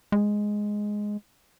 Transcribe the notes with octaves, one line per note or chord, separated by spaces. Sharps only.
G#3